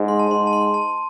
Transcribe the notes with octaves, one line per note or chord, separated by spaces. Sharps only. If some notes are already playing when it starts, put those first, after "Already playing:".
Already playing: G#2
C6
A5
G#2 C6
A5
C6
A5